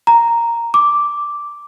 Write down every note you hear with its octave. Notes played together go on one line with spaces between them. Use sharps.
A#5
D6